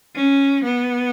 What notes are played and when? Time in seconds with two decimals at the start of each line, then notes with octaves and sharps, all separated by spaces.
0.15 C#4
0.64 B3